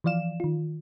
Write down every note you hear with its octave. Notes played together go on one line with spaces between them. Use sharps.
E3 F3 D5 F5 E7
D#3 F4